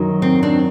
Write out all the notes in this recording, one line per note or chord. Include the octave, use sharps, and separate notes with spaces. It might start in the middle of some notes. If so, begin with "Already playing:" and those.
Already playing: F#2 D#3 F#3
C4
C4 D4